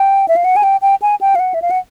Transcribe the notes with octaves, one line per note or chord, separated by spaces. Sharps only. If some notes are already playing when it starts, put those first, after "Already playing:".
Already playing: G5
E5
F5
F#5
G#5
G5
G5
G#5
G5
F5
F#5
E5
F5
F#5